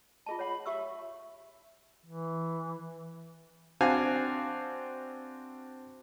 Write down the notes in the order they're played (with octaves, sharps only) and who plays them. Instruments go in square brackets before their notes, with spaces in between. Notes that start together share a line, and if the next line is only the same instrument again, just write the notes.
[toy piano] F4 G#4 A5 [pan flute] D#5
[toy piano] C#5 F#5 [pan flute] B5
[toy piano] G4 C#6 E6 [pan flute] E5
[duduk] E3
[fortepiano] C4 D4 F#4 F5 G#5